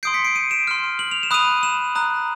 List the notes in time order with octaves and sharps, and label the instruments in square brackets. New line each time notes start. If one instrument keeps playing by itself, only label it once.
[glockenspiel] C6 D#6 G6 C7 D7
B6 C#7
C7 D7
C#7 D#7
D7 E7
C6 F6
F#7
F7
E7
B5 D#6 F#6 D#7 F7
E7 F#7
A#5 D#6 F#6